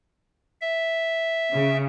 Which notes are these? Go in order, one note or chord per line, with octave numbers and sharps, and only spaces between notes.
E5
C#3